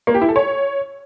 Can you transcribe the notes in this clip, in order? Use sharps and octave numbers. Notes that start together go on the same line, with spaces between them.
A#3
G4
E4
A4
C#5